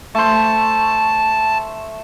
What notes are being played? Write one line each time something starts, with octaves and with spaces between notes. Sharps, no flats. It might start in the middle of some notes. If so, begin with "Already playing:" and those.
A3 C5 A5